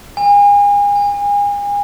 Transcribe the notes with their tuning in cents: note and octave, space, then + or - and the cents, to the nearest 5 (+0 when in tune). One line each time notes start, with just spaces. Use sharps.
G#5 -35
G#5 -30